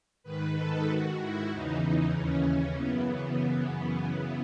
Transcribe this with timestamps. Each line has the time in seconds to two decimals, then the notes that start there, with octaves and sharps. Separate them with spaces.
0.23 G#2 D#3 B4
0.55 A4
0.86 G#2 D#3 F#4
1.18 E4
1.50 E2 C#3 E3 D#4
1.81 D#4
2.12 D#2 C#3 E3 C#4
2.74 F#2 C#3 E3 B3